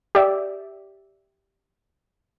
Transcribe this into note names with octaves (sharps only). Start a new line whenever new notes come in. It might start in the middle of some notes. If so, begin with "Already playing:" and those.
G4 D5 E5